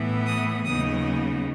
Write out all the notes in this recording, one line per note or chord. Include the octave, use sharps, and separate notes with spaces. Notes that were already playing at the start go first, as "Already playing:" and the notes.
Already playing: A2 E3 B3
D#6
D#2 C#3 F#3 B3 D#4 D#6